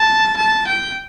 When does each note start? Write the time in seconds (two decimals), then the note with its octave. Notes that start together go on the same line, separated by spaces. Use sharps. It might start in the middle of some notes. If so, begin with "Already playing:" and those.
Already playing: A5
0.37 A5
0.67 G5